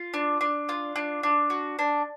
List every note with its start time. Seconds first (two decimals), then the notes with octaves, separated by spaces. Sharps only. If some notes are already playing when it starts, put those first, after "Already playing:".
Already playing: F4
0.14 D4
0.41 D4
0.69 F4
0.96 D4
1.23 D4
1.50 F#4
1.79 D4